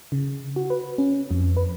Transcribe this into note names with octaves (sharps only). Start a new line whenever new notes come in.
C#3
F#4
B4
C#4
F2
B4